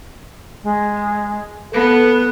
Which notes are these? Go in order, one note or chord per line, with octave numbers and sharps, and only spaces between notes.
G#3
B3 A4 B4